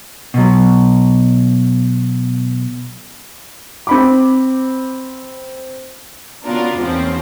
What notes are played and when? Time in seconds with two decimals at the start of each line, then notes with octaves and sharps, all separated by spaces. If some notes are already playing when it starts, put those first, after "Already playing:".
0.34 B2 F#3
3.87 C4 B5 D6
6.44 C#3 B3 D4 F4 F#4 A#4
6.79 E2 G#2 F3 A#3 C4 C#4